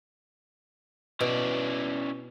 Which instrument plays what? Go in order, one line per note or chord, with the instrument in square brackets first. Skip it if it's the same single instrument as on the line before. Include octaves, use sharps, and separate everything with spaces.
[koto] B2 [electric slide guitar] C#4 E4 D5